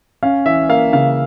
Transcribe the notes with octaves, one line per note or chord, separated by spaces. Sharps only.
C#4 F5
E3 E5
A#3 F5
C#3 F5